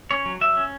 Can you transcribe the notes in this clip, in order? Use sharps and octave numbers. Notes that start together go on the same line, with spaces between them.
C#4 C#5
F#3
F#3 E5
C#4